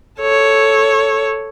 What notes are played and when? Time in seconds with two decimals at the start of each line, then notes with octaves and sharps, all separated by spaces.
0.21 A4 C#5